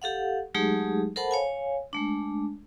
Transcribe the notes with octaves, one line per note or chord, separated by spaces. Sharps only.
G4 A4 F5 F#5
F#3 G#3 A3 D#4 G4 G#4
A4 A#4 C5 F#5 A5 B5
C#5 F5 G#5
G#3 A3 D4